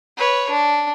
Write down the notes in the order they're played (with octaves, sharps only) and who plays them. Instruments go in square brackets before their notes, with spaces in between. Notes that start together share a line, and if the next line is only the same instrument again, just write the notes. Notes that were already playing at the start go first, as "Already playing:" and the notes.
[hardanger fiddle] B4 C#5
D4